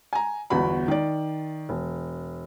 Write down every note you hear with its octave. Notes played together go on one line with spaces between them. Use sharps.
G#5 A#5
G1 E2 F#4 B5
D#3 D5
E1